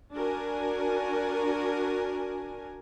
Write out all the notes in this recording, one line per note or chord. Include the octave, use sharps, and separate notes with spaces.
D4 F#4 A#4 G#5